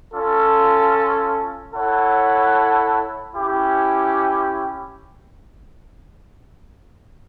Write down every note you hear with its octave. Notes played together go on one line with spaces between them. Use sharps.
C#4 F4 A4
E4 A4 C#5 F#5
C#4 E4 G4